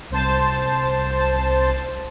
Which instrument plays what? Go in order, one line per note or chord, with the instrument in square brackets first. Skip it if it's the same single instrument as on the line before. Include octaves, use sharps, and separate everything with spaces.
[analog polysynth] C2 C5 A5